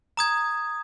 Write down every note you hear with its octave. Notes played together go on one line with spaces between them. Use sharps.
A#5 D#6 G#6